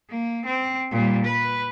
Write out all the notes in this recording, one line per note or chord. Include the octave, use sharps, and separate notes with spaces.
A#3
C4
A#2 G3
B4